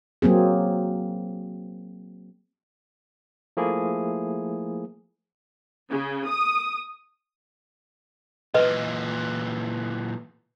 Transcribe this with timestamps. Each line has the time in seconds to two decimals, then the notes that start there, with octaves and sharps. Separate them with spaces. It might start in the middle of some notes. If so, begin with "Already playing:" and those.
0.22 F#3 A#3 C4 G#4
3.57 F3 A3 A#3 E4 G#4
5.90 C#3
6.28 D#6
8.54 A#2 E3 B4 D#5